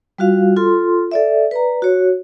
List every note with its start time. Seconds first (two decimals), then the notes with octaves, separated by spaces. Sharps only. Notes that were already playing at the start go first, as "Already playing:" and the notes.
0.18 G3 F4 F#4 F5
0.56 F4 A4 C6
1.11 A4 D5 E5
1.51 B4 D5 A#5
1.82 F#4 C#5